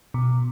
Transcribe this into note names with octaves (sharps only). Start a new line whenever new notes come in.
B2